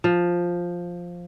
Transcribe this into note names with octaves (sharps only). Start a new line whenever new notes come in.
F3